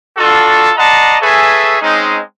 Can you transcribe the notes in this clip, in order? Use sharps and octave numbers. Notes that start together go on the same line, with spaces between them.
D4 F4 F#4 A4
D5 D#5 F#5 A5 A#5 C6
G#4 A4 B4 C#5 E5 G#5
G#3 C4 C#4 D#4